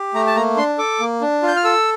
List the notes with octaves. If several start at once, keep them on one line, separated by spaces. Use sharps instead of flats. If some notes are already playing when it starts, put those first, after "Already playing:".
Already playing: G4
A3 A#5
A5
A#3 A#5
D4 C6
A4 D6
A#3
D4
F4
G6
F6
A4 E6